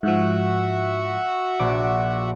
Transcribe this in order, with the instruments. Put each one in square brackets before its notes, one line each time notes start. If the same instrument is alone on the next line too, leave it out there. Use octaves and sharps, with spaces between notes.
[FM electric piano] G#2 F3 [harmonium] F#4 E5 F#5
[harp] A#1 [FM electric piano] D6